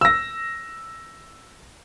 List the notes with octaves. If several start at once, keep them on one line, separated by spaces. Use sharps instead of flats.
E6 A#6